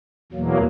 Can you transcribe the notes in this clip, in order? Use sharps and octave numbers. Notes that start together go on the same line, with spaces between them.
E2 B2 F#3 A#3